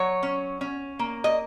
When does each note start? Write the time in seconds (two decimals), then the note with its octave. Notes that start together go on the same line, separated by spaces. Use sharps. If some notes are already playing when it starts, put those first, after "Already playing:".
Already playing: F#3 C#5
0.23 C#4
0.61 C#4
0.99 A#3
1.24 D#5